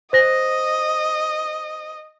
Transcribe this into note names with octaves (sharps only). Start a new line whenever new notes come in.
C5 D#5 A#6